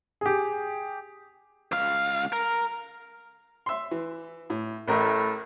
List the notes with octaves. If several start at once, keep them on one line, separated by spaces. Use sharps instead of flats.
G4 G#4
C#2 F5
A#4
E5 C6
E3
A2
A1 A2 A3 A#4